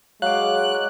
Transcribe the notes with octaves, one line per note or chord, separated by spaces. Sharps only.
F#3 G#3 F5 D6 F#6